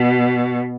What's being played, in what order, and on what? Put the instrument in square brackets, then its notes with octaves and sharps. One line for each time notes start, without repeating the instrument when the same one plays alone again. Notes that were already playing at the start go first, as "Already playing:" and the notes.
Already playing: [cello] B2